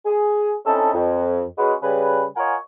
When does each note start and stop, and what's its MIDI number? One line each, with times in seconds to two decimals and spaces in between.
0.06 0.55 68
0.65 0.92 60
0.65 0.92 61
0.65 0.92 63
0.65 0.92 64
0.65 0.92 69
0.94 1.43 41
1.58 1.74 56
1.58 1.74 61
1.58 1.74 66
1.58 1.74 71
1.82 2.24 49
1.82 2.24 55
1.82 2.24 68
1.82 2.24 71
2.37 2.55 65
2.37 2.55 70
2.37 2.55 73
2.37 2.55 75
2.37 2.55 78
2.37 2.55 80